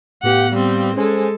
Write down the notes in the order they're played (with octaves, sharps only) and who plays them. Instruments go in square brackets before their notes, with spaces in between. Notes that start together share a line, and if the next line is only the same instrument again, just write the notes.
[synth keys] A2 B3 F5 [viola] G4 F#5
[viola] G3 C4
[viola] G#3 A4 [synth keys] C#4 C5 G#5